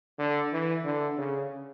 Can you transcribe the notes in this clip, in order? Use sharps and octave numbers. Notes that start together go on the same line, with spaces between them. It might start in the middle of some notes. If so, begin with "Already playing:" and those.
D3
E3
D3
C#3